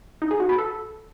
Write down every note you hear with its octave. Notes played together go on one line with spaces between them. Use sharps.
D#4
G#4
F#4
B4
A4